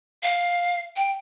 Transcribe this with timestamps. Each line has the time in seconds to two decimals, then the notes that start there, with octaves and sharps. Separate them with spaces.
0.23 F5
0.96 G5